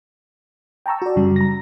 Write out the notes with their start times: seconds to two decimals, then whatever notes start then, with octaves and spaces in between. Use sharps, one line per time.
0.86 G5 A5 A#5 C#6 E6
1.02 F#4 D5
1.16 F#2 C#3 G3
1.36 A#5 A#6